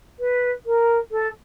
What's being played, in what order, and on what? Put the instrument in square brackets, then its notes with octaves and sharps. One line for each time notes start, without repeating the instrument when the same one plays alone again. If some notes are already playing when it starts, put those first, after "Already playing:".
[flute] B4
A#4
A4